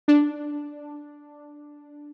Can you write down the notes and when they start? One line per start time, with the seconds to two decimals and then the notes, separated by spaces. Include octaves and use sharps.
0.08 D4